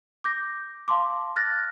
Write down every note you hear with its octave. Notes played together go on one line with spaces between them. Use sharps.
D6 G6 A#6
F5 A5 C6 D6
F6 F#6 A6 A#6